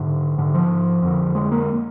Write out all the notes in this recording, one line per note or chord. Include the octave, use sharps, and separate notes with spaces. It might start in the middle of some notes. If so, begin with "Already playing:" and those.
Already playing: G#2 D3
G#2 D3
F3
F2 D3
G#3
A#3